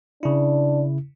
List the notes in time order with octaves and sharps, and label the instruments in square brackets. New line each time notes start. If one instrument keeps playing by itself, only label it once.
[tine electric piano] C#3 E4 [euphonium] D4